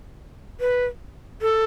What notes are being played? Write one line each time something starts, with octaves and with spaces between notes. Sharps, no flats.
B4
A4